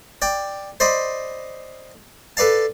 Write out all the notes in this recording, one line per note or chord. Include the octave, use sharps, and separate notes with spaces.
D5 G5
C5 D5 D#5 B5
A4 B4 D5 F5 A5